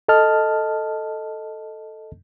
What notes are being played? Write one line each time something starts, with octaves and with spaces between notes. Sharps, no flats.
A4 D#5 A5 F6